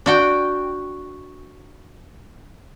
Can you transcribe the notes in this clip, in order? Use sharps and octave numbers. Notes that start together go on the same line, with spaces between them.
D4 F#4 G5